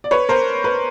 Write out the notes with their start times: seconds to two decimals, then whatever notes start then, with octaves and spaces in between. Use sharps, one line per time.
0.04 D5
0.11 B4 C#5
0.29 A#4 C5
0.64 B4